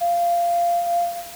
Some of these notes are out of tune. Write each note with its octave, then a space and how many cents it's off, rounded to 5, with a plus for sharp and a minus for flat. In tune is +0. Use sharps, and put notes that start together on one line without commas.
F5 -15